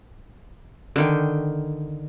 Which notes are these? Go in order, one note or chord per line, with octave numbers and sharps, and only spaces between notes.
D3 D#3 G5